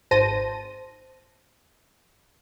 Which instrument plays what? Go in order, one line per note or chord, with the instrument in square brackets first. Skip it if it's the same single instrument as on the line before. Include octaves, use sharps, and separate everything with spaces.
[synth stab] G#1 C5 A5 A#6 D#7